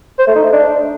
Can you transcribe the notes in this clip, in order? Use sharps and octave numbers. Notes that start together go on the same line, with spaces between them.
C5
A3
D#4
A3
D4